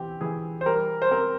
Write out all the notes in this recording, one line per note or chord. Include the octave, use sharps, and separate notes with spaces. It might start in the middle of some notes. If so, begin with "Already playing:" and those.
Already playing: E3 C4 G4
E3 G#4
C5
G3 A#4
C5
C4 A#4